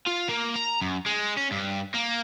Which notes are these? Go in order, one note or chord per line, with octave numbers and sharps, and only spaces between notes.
F4
A#3
A#5
F#2
G#3
C#4
G2
A#3